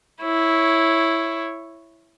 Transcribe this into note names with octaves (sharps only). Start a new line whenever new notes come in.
E4 C#5